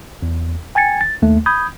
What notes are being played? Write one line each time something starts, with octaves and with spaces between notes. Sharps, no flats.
E2
G5 G#5 G#6 A6 C#7
A6
D#2 A3
B5 D#6 G6 G#6